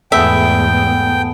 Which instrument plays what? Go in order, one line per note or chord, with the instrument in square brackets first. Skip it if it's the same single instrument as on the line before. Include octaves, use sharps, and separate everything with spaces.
[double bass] E2 G#2 [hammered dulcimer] A3 B3 G#4 [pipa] E5 [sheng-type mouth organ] G5